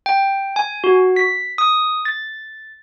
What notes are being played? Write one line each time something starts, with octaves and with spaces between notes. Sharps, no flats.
G5
G#5
F#4
B6
D#6
A6